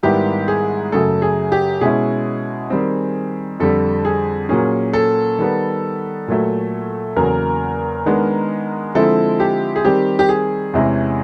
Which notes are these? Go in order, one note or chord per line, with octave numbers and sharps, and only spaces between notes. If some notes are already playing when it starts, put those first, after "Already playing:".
G#2 D#3 G3 B3 E4 G4
G#4
F#2 C#3 F#3 A3 A4
G#4
G4
B2 G#3 C#4 E4 G#4
D#3 G3 C4
F2 D3 G3 A4
G#4
A#2 F#3 A#3 C#4 G#4
A4
D#3 G3 B3
A#2 F#3 A3
E2 C#3 F#3 A#3 A#4
D#3 G#3 B3 D4
D3 F3 G#3 C4 E4 A4
G4
G#4
D#3 G3 C4 G4
G4
G#4
E2 C3 E3 G#3 C#4